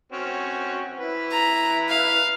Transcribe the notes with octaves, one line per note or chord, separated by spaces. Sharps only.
C4 C#4 F#4
E4 B4
A#5
F5